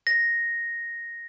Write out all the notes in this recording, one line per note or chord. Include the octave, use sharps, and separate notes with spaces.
A#6